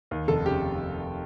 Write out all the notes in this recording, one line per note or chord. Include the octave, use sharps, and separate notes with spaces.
D#2
F1 A4
C#3 G4